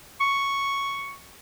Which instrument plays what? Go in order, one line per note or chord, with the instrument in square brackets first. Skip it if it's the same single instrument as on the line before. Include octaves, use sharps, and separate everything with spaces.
[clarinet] C#6